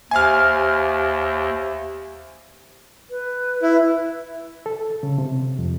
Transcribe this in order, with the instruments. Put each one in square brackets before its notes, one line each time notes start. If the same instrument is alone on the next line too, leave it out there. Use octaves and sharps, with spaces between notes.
[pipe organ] D#2 [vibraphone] G4 C5 E5 [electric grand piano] G#5 F6
[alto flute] B4
[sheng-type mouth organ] E4
[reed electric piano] A4
C#3
C3
F2